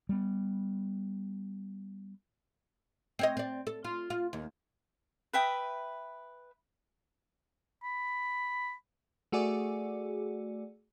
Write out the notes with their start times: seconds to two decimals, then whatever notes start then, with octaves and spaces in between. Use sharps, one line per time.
0.09 G3 B3
3.19 C4 C#5 D#5
3.37 C4 D5
3.67 A4
3.84 F4
4.10 F4
4.33 D#2
5.33 B4 E5 G5 D#6
7.83 B5
9.32 A3 F#4 G#4 D5